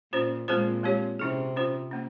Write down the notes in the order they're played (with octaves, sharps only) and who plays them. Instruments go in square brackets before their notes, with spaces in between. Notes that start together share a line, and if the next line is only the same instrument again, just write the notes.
[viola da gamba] A#2 [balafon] C#4 F4 C5
[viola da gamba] A#2 [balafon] G#3 C4 F4 G#4 C5
[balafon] G#3 C4 G4 C#5
[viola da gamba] C3 [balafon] C#4 E4 G#4
[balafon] C#4 F4 C5
A#3 C#4